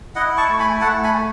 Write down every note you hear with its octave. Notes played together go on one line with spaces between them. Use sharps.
E4 D#5 F#5
A5 C#6
A3
G#5 B5
A3 F#5 A5
G#5 B5
A3